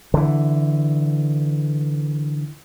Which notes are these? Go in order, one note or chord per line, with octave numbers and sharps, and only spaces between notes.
D3 E3